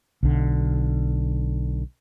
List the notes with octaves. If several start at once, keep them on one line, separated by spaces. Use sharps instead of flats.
B1 D3